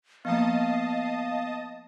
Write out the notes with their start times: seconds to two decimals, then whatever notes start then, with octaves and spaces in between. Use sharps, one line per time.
0.25 F3 A#3 B3 D#5 F5 A5 D#6